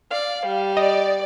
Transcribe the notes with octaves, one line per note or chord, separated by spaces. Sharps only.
D5 F5
G3
D5 D#5